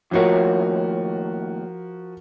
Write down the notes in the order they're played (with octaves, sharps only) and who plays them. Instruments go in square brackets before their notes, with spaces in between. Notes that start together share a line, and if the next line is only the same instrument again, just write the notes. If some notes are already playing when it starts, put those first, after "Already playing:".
[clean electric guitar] D#2 A2 C#5 [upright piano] F3 F#4 A#4